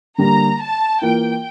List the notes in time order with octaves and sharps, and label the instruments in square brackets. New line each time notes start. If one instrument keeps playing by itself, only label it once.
[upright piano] D3 G3 A#3 [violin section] A#5
[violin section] A5
[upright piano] E3 A#3 F4 A#4 [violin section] G5